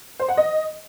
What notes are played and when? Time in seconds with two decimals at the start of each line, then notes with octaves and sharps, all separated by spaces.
0.20 C5
0.28 F#5
0.37 D#5